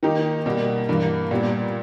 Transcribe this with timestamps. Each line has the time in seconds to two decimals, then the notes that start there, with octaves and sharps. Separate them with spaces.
0.03 D#3 A#3 D#4 G4
0.46 B2 G3 A#3
0.89 G2 E3 A#3
1.31 A#2 G3 B3